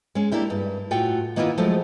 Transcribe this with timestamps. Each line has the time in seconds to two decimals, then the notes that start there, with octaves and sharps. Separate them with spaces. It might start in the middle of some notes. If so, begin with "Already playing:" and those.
0.15 G#3 C#4
0.32 A#3 D4 E4 G4
0.50 G2
0.91 A2 F4 F#4 G5
1.36 D#3 A#3 B3 E4 F4
1.57 F3 F#3 G#3 A3 F4